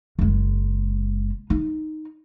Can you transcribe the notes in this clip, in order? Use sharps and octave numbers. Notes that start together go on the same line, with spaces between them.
F#1 G#3
D#4